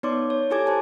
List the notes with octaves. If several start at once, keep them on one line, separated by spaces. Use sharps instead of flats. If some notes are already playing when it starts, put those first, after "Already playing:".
B3 D#4 C#5 D5 C6 D6
C#5
E4 G4 A4 G#5 D6 G#6
C5 G#5 A5